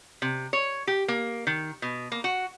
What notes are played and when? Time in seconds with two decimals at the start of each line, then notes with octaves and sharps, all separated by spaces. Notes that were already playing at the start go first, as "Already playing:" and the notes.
0.22 C3
0.53 C#5
0.87 G4
1.08 A#3
1.47 D#3
1.82 B2
2.12 A#3
2.24 F#4